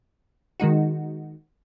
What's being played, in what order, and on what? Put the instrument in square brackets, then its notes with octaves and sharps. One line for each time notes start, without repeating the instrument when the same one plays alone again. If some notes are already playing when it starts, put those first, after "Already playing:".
[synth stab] D#3 G#3 D#4 F#4